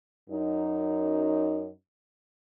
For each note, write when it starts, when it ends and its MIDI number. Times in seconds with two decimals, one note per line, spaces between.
0.29 1.69 42
0.29 1.69 63